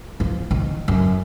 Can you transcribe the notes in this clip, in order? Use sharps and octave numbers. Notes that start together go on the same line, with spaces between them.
F3
D#3
F#2